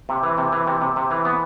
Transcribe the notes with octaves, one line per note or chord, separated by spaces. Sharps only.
C3
E3
C3
E3
C3
C3
C3
E3
B3